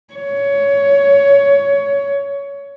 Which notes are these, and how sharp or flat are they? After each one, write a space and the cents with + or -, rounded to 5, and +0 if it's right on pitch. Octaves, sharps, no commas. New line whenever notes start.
C#5 +20